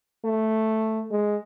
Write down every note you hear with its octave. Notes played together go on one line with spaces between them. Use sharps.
A3
G#3